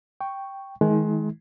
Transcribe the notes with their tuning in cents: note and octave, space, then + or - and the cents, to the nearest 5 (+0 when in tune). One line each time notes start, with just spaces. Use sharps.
G5 +0 C#6 +0
D#3 +30 G#3 +30 E4 -45